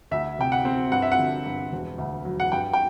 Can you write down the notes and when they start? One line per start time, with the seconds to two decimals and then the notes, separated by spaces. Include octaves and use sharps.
0.11 D2 E5
0.39 C3 G5
0.52 F#5
0.65 C4
0.92 G2 F#5
1.02 E5
1.12 F#5
1.19 D3
1.46 G2
1.72 E1
1.98 D2
2.25 F#3
2.40 F#5
2.52 G2 G5
2.73 G5